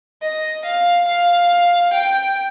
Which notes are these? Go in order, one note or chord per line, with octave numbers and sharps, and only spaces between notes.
D#5
F5
F5
G5